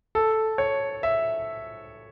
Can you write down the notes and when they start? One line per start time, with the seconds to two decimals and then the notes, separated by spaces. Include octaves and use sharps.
0.15 A4
0.58 C#5
1.03 E5